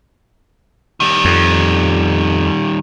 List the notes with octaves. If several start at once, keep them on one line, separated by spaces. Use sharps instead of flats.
D#3 G3
F2